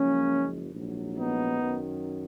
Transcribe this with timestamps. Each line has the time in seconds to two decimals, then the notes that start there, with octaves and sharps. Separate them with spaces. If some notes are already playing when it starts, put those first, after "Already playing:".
Already playing: F#1 F#2 F3 G#3 A#3 C#4
0.74 A#1 G#2 F#3
1.17 B3 D#4
1.61 F#2 D#3 F#3